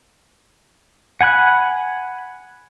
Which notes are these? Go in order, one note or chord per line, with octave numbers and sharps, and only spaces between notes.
F#5 G#5 B5 F#6